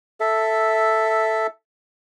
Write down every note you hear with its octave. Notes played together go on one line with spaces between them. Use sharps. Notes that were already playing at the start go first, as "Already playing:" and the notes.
A4 E5